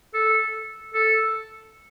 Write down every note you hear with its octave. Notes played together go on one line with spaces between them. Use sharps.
A4
A4